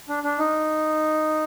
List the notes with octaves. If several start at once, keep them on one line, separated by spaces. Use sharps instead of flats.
D4
D4
D#4